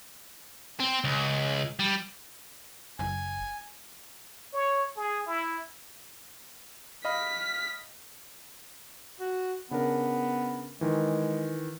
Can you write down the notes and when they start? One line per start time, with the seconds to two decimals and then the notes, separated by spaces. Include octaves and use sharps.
0.80 C4
1.04 C#2
1.79 G3
2.99 F#1 G#5
4.53 C#5
4.96 G#4
5.26 E4
7.05 D#5 F5 B5 F6 B6
9.20 F#4
9.71 C#3 B3 D4 A#4
10.81 D#3 E3 G#3